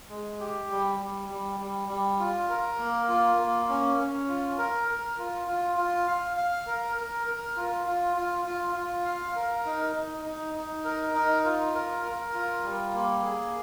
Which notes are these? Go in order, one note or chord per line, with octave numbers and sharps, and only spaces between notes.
G#3
G4
G3
G3
G3
G3
G3
F4
A#4
A#3
F4
A#3
C#4
C#4
F4
A#4
A#4
F4
F4
F4
F5
F5
A#4
A#4
A#4
F4
F4
F4
F4
F4
F5
A#4
D#4
D#4
D#4
D#4
A#4
D#4
F4
A#4
A#4
F4
G3
A#3
G#4